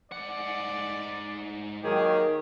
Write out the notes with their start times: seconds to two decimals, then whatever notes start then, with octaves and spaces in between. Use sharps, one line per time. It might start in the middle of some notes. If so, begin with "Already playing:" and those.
0.12 G#2 D5 F#5
1.84 D#3 F#3 A#3 G4 G#4